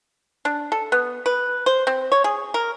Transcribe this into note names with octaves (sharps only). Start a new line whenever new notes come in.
D4
A4
B3
B4
C5
C4
C#5
G#4
A#4